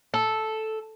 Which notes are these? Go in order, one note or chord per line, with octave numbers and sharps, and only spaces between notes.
A4